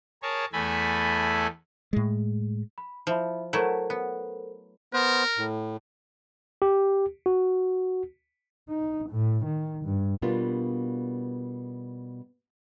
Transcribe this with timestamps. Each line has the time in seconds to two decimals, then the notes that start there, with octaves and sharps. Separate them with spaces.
0.23 G#4 A#4 C#5 A5
0.53 E2 A3 A4 G#5 B5
1.93 A2 G#3
2.78 B5
3.07 F3 E4 E5 B5
3.53 F#3 A3 E4 A4 A#4 C5
3.90 B3
4.93 B3 A#4 C5
5.38 A2
6.62 G4
7.26 F#4
8.69 D#4
9.10 A2
9.45 D#3
9.85 G2
10.22 B2 G3 A#3 B3 D4 F4